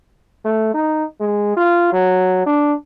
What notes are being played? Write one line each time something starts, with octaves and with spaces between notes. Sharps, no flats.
A3
D#4
G#3
F4
F#3
D4